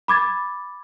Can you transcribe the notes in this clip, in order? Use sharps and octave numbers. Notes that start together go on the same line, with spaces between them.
B5 D6 G#6 A6